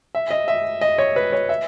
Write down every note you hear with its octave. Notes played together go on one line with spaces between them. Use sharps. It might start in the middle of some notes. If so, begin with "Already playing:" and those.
E5
D#5
E5
D#5
C#5
B4
C#5
E5